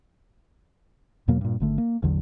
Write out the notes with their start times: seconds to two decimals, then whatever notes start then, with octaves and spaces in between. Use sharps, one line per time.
1.28 E2 B2 F#3 A#3
1.41 G2 A#2
1.60 G#1 D3 A3
1.78 A#3
2.02 A1 E2 D3 F#3